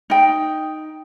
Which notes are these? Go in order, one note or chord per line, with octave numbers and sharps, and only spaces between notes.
D#4 G5